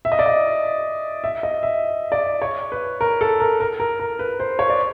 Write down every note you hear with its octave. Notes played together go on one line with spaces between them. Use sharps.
E5
D#5
D5
D#5
E5
D#5
E5
D5
C#5
B4
A#4
A4
A#4
A#4
A#4
A#4
B4
C5
C#5
D5